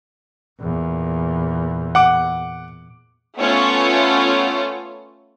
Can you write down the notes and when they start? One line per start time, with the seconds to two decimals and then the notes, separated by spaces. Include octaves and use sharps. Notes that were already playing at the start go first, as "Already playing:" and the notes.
0.60 E2 A#2
1.95 F#5 D6
3.37 A3 B3 C#4 F4 C#5